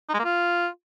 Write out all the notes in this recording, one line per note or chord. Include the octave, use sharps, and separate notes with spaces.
D#4
G#3
A#3
F4